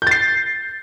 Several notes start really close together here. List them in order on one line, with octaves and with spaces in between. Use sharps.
G6 A6 C7